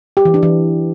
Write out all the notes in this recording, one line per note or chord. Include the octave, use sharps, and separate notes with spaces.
G4
E3
D4
E3